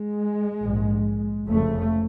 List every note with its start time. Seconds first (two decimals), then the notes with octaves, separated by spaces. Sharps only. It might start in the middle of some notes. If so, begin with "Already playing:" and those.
Already playing: G#3
0.63 A#1 G#2
1.47 F1 F2 C#3 A3